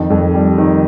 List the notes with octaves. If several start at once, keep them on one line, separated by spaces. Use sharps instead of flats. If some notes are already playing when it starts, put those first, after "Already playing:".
Already playing: F2 D#3
F2
G3
D#3